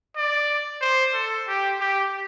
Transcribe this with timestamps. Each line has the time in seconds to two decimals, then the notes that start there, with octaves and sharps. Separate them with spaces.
0.16 D5
0.82 C5
1.14 A4
1.48 G4
1.80 G4